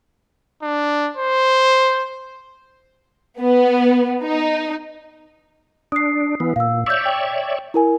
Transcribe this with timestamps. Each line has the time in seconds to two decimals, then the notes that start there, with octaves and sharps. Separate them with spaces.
0.62 D4
1.17 C5
3.40 B3
4.23 D#4
5.92 D4 D#6 C7
6.40 E3 B3
6.56 A#2 F5 E6
6.86 C#5 D5 E5 E6 G6
7.05 G5
7.74 E4 A#4 G#5